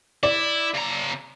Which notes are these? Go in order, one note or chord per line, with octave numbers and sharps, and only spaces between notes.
E4 D5
C#3 A#5